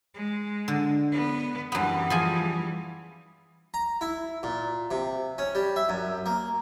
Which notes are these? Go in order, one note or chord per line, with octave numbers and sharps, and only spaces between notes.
G#3
D3
B3
F#2 E3 G3 B3
F3 G#4 G#5
A#5
E4
A#2
C3
C#4
G3
E5
F#2
A#3